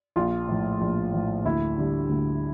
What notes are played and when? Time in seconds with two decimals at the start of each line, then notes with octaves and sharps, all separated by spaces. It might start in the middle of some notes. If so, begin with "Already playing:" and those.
0.16 A#1 F4
0.49 A2 F3
0.81 A#1
1.13 A2 F3
1.45 D2 E4
1.78 D3 G3
2.09 D2